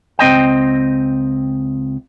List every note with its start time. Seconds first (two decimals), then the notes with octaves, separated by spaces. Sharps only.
0.19 C#2 C4 D#5 G5